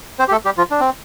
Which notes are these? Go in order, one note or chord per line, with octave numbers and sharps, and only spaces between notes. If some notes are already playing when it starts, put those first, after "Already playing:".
C4 C5
G4
A3 A4
G3 G4
F3 F4
D4
C4